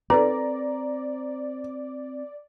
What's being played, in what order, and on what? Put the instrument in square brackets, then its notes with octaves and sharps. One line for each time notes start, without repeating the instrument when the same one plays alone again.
[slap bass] C4 [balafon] A4 B4 [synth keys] D5 [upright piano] A#5